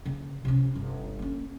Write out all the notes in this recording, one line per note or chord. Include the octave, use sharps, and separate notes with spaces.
C#3 A#3
C3 C#4
G1
A#3 C#4